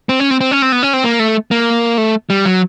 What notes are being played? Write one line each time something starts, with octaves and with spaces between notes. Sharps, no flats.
C4
C#4
C4
C4
C#4
C4
B3
C#4
C4
A#3
A3
A#3
A3
G3
F#3